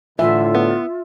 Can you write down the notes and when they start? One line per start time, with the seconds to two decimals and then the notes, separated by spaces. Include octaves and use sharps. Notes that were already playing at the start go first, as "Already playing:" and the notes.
0.19 A2 D3 E3 F4 E5
0.55 B3